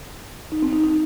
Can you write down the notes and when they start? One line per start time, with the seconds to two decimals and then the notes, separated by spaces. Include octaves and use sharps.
0.52 D#4
0.62 C4
0.73 D#4
0.84 D#4